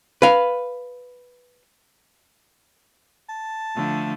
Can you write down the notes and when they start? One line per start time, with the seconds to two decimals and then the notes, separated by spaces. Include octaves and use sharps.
0.22 B4 F5
3.29 A5
3.76 D3 F3 A3